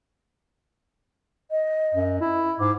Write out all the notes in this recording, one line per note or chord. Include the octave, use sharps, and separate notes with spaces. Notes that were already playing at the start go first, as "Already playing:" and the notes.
D#5
F#2
E4
G#2 D6